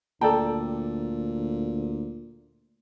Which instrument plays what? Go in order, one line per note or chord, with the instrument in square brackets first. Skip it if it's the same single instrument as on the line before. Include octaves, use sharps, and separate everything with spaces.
[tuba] D2 [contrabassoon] A#2 [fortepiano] A4 D5 G5 [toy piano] A5 A#5